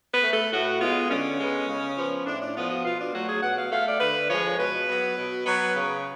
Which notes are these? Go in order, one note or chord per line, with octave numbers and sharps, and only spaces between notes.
B4
A3
A4
A2 F#4
G#3 B3 F4
D3 C#4
G#3 B3
C#3
F3 B3
A2 D4
D4
F3 B3 F4
F#4
B2 F4
D4
F#3 A3 F#4
G#4
B2 F#5
F5
A3 F5
D5
D3 B4
F3 G#3 C#5
B2 B4
F#3 B3
B2
F#3 B3
C#3